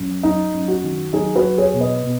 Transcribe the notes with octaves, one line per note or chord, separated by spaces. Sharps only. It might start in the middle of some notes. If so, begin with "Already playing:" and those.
Already playing: F#2
F#3 D#4
F#2
F#4
D#3
F#3 D#4 G#4
F#4 B4
F#3
G#4 C#5
B2
B4 D#5
B2